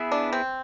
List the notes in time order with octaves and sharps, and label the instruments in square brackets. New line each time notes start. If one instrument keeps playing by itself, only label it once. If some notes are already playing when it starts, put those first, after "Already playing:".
Already playing: [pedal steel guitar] B3 E4 G#4 B4 E5
[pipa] D4
C4